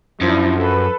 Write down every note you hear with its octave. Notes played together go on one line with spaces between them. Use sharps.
F#2 F3 D4 E4
A4 B4